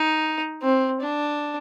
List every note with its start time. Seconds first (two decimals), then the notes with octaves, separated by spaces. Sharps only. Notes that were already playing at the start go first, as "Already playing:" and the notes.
Already playing: D#4
0.62 C4
1.01 D4